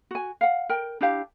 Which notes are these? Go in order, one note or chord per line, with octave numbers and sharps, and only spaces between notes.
F#4 G#5
F5 F#5
A#4 G5
D4 E4 G4 F5